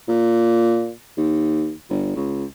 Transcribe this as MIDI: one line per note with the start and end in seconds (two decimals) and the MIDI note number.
0.08 0.92 46
1.18 1.73 39
1.90 2.13 31
2.16 2.45 37